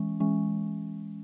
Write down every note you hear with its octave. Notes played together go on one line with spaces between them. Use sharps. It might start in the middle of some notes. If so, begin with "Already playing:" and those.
Already playing: E3 G#3 C#4
E3 G#3 C#4